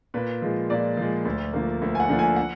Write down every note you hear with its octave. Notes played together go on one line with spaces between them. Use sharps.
A#2 B4
F3 G#3
A#2 D5
F3 G#3
D2
D3 F3 A#3
D2
G#5
F#5
D3 F3 A#3
G#5
F#5